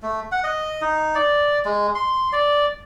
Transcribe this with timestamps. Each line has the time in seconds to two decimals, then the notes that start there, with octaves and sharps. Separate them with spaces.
0.03 A3
0.32 F#5
0.44 D#5
0.81 D#4
1.15 D5
1.65 G#3
1.95 C6
2.32 D5